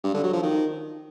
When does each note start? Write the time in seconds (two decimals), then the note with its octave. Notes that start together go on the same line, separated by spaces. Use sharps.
0.04 G2
0.14 D3
0.24 F#3
0.33 F3
0.43 D#3